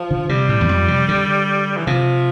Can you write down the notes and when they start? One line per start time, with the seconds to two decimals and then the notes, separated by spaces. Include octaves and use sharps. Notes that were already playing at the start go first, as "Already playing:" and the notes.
Already playing: F3
0.11 D3
0.29 C3 G3
0.49 A2
0.61 E2
0.69 F2
0.88 C3
1.08 D3
1.77 E3
1.87 C3 F3